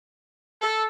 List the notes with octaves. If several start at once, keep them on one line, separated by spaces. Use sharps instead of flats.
A4